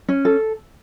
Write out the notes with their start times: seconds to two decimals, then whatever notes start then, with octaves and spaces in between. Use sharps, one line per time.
0.09 C#4
0.25 A4